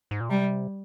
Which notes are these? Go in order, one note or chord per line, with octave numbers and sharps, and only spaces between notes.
G#2
A#2
C3 G3